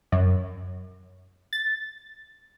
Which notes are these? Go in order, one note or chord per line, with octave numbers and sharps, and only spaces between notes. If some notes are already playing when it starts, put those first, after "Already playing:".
F#2
A6